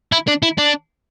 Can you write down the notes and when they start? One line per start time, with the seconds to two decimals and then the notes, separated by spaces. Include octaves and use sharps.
0.12 E4
0.28 D4
0.43 E4
0.58 D4